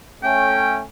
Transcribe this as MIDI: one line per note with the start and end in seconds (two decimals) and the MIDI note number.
0.23 0.82 57
0.23 0.82 61
0.23 0.79 79